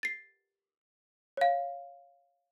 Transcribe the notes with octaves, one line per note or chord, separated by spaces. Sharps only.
A6 C7
C#5 F5